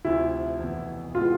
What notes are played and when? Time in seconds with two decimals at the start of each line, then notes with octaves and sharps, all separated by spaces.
0.05 D2 C3 F3 E4
0.60 F1 E2 B2
1.15 C3 E3 G#3 B3 F4